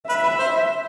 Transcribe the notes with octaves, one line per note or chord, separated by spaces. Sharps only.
B4 E5
B4
C5